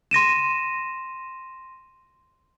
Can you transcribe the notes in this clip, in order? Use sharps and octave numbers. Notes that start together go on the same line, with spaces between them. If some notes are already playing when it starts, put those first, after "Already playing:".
C6 A#6 D#7 E7